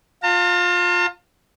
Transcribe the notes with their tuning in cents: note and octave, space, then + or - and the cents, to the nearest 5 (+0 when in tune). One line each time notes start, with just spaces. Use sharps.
F4 +20 A5 +45